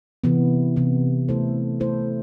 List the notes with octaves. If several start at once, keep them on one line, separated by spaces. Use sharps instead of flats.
C3 E3 B3
C3 E3 B3
A3 E4 A4 C5
A3 E4 A4 C5